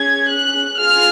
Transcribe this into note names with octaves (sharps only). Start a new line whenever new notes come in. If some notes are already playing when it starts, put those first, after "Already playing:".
Already playing: C#4 G#4 G#6
F#6
F4 G#4 F6